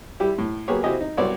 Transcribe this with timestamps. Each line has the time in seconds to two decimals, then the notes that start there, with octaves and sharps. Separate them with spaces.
0.20 G3 E4 G4
0.38 A2
0.68 F#3 A#3 B3 G4 G#4 C#5
0.83 C4 E4 F#4 G4 D#5 G#5
1.01 D#4
1.17 C2 F#3 B3 F#4 C#5 D5